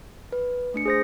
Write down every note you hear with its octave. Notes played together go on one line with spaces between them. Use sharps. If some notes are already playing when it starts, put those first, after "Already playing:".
B4
A3 D4 C#7
G#4 C5 A#6